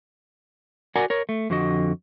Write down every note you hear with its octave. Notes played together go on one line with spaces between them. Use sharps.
F#4 A#4 D5 F#5 G#5 A#5
A#4 C#5
A3
F2 D3 F#4 D#5